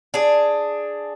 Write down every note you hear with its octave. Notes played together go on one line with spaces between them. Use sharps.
D4 G#4